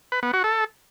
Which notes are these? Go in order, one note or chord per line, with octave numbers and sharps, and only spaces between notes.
B4
B3
F#4
A4